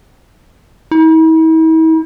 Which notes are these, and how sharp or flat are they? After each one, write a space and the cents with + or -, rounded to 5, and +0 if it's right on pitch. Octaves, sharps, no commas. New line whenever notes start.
E4 -45